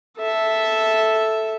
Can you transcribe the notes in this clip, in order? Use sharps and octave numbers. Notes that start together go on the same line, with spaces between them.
A4 E5